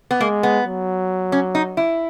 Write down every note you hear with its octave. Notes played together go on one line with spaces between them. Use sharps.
B3
G#3 A#3
B3
F#3
C#4
D#4
E4